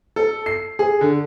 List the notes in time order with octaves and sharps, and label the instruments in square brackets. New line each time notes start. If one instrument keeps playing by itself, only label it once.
[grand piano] A4
C7
G#4
D3